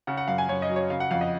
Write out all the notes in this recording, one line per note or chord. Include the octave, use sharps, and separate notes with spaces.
C#3 F#5
F#5
F#2 F5
G#5
F#2 C#5
D#5
F#3
C#5
C#3 F5
F#5
F2 F5
D#5